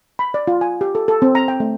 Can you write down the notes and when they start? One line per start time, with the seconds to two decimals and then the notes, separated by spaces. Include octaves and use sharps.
0.19 B5
0.34 D5
0.48 F4
0.61 G#5
0.81 G4
0.95 A4
1.08 A4
1.22 C4
1.35 A#5
1.48 G5
1.60 A3